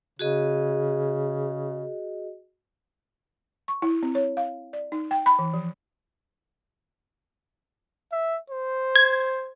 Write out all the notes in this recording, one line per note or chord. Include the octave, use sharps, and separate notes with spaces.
C#3 F#4 G#4 D#5
C#6
E4
C4
C#5
F5
D5
D#4
G5
B5
E3
F3
E5
C5
G#6